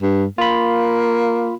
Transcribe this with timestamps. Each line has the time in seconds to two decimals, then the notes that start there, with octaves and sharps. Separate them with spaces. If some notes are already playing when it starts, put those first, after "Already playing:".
0.02 G2
0.38 A#3 F4 B5